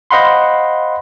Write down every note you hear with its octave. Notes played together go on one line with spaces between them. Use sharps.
C5 D#5 F5 F#5 B5 C6